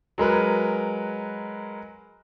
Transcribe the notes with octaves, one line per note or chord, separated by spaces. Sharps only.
F#3 G#3 A#4 B4